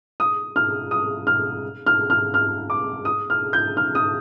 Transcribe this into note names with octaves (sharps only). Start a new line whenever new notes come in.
D#6
F6
D#6
F6
F6
F6
F6
D6
D#6
F6
G6
F6
D#6